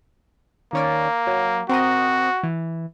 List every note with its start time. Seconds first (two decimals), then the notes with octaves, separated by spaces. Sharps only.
0.73 D#3 A#3 C#4 D5
1.27 F#3
1.69 C4 F#4 A#4 D#5
2.43 E3